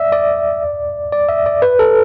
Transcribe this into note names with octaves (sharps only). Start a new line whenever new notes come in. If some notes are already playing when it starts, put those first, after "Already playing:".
Already playing: D5 E5
D5
D5
E5
D5
B4
A4